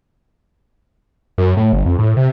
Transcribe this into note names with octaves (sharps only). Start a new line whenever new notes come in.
F#2
A2
G1
F2
A2
C3